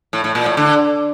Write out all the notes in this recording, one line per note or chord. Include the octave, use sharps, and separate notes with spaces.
A2
A2
A#2
A2
D3